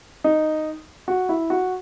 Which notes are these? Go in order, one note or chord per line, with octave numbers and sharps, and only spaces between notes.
D#4
F#4
E4
F#4